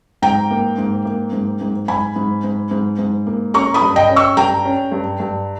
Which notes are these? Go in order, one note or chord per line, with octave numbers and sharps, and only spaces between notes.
G#2 G5 A#5
A#3
G#2
A#3
G#2
G#2
G#2 G#5 B5
G#2
G#2
G#2
G#2
A#3
C#4 A#5 C#6
B5 D#6
G2
D#5 G5
C#4
C#6 E6
G2 G5 A#5
C#4
G2
G2